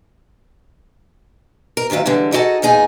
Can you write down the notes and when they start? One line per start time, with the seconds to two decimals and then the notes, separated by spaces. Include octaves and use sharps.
1.77 A#4
1.90 D2 D#3 F#3 F4 E5
2.06 D3 E3 G3 G#3
2.32 D#4 E4 F#4 G#4 A4 D#5
2.62 E2 A#2 D#4 G#4 G#5